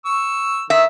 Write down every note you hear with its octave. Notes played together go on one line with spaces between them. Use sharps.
C#6 E6
D#3 E5